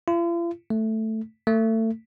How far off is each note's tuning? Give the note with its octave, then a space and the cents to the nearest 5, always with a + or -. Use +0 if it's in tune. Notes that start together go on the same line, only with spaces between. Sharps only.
F4 -45
A3 +5
A3 +30